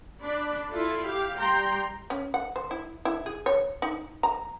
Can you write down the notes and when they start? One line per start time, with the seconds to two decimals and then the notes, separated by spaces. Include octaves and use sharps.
0.22 D4 B5
0.70 E4 F4 A4
1.03 G4 F5
1.37 G3 G5 A#5 C6
2.10 C#4
2.34 F#5
2.56 C5
2.71 E4
3.05 E4
3.26 G#4
3.46 C#5
3.82 D#4
4.23 A#5